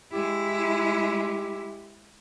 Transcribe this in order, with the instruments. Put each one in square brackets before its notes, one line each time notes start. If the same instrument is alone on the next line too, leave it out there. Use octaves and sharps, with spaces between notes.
[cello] G#3 E4 [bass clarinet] G4